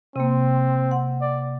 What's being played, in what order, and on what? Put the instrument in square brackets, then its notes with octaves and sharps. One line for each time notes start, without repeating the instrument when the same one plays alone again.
[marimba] C3 A#3 [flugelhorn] C4
[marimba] F#5
[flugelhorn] D5